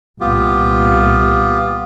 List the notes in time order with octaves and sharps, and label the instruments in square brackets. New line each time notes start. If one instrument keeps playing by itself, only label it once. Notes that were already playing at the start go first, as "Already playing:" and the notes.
[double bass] C2 A#2 [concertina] B3 F4 G4